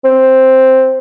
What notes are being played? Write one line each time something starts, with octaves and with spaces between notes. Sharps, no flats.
C4